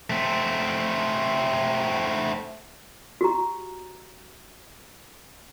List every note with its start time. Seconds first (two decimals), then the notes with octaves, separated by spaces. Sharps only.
0.10 A3 C4
3.21 F#4 G4 A#5